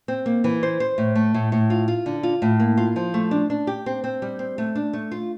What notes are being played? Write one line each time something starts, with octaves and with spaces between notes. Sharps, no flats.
C4
A#3
E3
C5
C5
A2
A3
A2
A2
F4
F4
D3
F4
A2
A#3
F4
F3
A3
D4
D4
G4
C4
C4
G3
C4
A3
D4
A3
F4